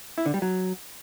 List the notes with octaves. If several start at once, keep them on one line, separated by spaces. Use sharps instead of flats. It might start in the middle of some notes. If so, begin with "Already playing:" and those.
E4
D3
G3
F#3